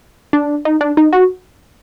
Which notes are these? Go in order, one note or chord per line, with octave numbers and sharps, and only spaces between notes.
D4
D#4
D4
D#4
F#4